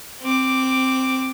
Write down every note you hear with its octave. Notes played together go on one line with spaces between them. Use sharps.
C4 D6